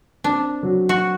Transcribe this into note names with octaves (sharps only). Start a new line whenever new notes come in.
C4 D4
F#3
F#4